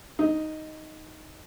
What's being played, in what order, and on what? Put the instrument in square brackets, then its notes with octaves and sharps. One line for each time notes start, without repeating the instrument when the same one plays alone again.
[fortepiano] D#4